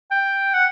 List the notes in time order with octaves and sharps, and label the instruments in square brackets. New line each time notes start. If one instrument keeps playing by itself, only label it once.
[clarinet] G5
F#5